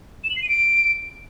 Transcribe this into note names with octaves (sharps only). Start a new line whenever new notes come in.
E7
F#7
C7
D#7
D7